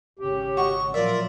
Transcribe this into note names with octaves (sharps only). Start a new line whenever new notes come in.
G#1 C#3 C#4 G4
F#4 D#5 C#6
A#2 F3 F#3 F4 A#4 D5 E5